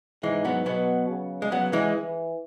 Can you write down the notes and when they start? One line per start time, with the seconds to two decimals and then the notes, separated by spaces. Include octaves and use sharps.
0.23 G#2 E3 G#3
0.45 F#3 B3
0.66 B2 F#3 B3
1.09 C#3
1.42 G#3
1.52 F#3 B3
1.73 E3 G#3
1.95 E3